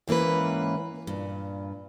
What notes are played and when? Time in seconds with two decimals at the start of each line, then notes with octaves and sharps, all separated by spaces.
0.08 G#2 E3 A#3 C#4 B4
1.07 G2 A#2